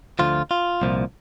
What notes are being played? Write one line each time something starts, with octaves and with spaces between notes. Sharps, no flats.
D2 D3 F3 F4
F4
C2 A#2 F3